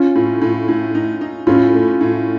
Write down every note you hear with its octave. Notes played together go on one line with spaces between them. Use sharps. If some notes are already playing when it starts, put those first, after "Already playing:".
Already playing: C#4 F4
A2
A2
A2
D#4
D#4
A2 C#4 F4
A3
A2